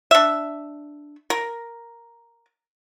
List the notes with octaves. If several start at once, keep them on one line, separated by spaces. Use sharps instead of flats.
D4 E5
A#4